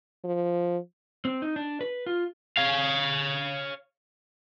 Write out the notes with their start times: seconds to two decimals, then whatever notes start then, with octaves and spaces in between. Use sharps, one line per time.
0.24 F3
1.25 C4
1.42 D#4
1.56 D4
1.81 B4
2.06 F4
2.57 C#5 F5